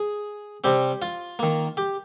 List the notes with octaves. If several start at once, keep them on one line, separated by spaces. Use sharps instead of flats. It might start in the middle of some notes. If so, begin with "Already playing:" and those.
Already playing: G#4
C3 G3 C4 G4
F4
D#3 A#3
G4